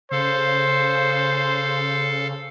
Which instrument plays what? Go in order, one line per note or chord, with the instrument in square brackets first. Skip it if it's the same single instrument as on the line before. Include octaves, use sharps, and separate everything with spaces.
[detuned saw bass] C#3 [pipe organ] A4 F5 [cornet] C5